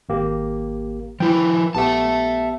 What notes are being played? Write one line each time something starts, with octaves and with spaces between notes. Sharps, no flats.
G#1 A#3 G4
F3 E4 G5
A#1 B3 G4 E5 A5